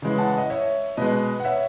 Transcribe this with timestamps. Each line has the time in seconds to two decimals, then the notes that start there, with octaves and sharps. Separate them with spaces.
0.02 C#3 E3 G#3
0.18 F#5 A5
0.38 D#5
0.50 C#5 E5
0.97 B2 G#3 B4 D#5
1.40 F#5
1.45 C#5 E5